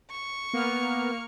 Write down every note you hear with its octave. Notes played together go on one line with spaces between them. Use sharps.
C#6
A#3 B3 F6